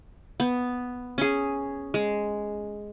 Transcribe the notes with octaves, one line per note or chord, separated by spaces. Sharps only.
B3
C#4 G#4
G#3